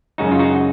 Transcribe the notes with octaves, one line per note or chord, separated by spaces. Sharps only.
F#2 C#3 G#3 D#4 F#4
F4
D#4 F#4